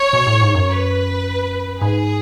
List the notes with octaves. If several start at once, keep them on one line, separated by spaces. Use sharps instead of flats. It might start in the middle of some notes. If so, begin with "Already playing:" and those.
Already playing: C#5
B2
A2
G#2
F#2
B4
G#2 G#4